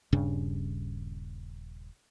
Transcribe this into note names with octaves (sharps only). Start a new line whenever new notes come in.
D#1 G2 C#3 D4